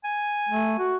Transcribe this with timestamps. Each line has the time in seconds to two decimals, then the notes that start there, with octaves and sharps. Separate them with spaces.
0.04 G#5
0.49 A3
0.79 F#4